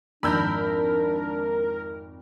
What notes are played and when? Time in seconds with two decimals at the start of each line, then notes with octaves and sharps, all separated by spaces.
0.23 G#1 F2 D4 A#4 B5 E6 G6